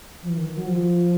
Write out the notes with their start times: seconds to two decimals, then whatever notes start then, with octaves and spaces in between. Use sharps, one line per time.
0.23 F3
0.29 E3
0.38 D#3
0.57 F#3
0.67 F3